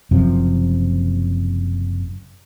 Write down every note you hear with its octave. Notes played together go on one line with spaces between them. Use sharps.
F#1 F#2 C3 F3